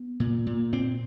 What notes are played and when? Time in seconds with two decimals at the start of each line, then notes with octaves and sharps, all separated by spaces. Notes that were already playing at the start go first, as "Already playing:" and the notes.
Already playing: B3
0.20 A#2
0.47 A#2
0.73 A#2 C4